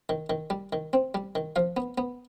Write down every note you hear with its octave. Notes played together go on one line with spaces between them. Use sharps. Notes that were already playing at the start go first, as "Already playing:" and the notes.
D#3
D#3
G3
D#3
C4
G3
D#3
F3 F5
B3
B3